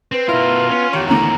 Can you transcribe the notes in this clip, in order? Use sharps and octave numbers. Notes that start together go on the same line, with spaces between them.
C4 B4
B2 E4 F4 A#4
B3 C#4
E2 D#3 G4 C#5
D#2 A2 D3 A#5